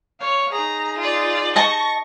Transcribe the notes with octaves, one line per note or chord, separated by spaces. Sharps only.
C#5 F5
D#4 G#4 A#5
F4 D5
D#5 A5 C#6 A#6